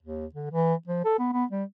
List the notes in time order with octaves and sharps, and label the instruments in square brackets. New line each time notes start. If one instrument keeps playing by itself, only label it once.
[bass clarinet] D#2
D3
E3
F3
A4
B3
B3
G3